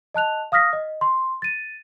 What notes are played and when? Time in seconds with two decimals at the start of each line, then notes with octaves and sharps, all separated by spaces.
0.15 D#5 A5 F#6 F7
0.52 F5 D#6 F6 A#6 B6
0.73 D#5
1.01 C6
1.42 A6 D#7